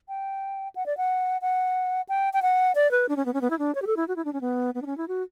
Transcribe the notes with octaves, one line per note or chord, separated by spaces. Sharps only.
G5
F#5
D5
F#5
F#5
G5
G5
F#5
D5
B4
D4
C#4
B3
C#4
B3
E4
D4
C#5
G4
A4
E4
F#4
E4
D4
C#4
B3
B3
D4
C#4
E4
F#4